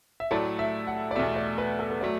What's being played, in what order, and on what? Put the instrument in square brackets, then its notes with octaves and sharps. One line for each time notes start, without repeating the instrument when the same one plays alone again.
[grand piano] E5
[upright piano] A2 F#3 A3 E4 A4 [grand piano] D5
[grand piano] E5
F#5
D5
[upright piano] E2 B2 A3 [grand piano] E5
[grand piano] D5
B4
A4
B4
[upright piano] F#3 A3 [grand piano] D5